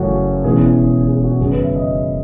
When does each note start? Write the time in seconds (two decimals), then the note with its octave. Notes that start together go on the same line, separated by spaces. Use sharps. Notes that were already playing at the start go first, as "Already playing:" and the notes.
Already playing: F#1 F#2 E3 A3 F#4
0.44 E1 E2 C#3 E3 G#4
1.08 G#4
1.24 F#4
1.40 F#1 F#2 D#3 F#3 B3 G#4
1.52 B4
1.63 E5
1.75 D#5